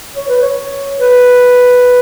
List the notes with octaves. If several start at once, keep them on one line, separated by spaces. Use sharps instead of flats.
C#5
B4
C#5
B4